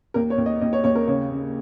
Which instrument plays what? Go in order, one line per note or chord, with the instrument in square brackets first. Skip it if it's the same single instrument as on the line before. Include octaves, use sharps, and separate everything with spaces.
[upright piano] D#2 A#4
C#5
D#2
D#5
D#2 D#5
C#5
D#2 C#5
A#4
C#3 C#5
C#3